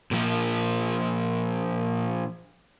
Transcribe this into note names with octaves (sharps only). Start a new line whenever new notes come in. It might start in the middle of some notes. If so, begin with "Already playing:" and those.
A#2 F3